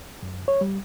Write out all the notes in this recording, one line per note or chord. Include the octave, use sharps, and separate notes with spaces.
F#2
C#5
G3